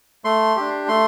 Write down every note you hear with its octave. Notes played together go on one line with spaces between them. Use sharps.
A3 C6
D4 G4
A3 C6